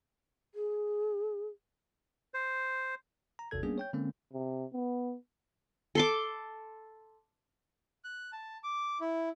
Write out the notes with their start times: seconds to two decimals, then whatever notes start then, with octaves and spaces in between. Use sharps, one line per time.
0.55 G#4
2.34 C5
3.39 A#5
3.51 G#1 E2 C3 A4 G#6
3.63 G3 A#3 B3 C#4 D4 G#4
3.78 C#5 G5 G6
3.93 D3 G#3 A#3 C4 C#4
4.33 C3
4.73 B3
5.95 A4 C6 D6
8.04 F#6
8.33 A5
8.64 D6
9.00 E4